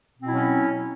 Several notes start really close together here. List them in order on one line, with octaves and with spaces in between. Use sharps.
B2 C4 E4 F#3 C#4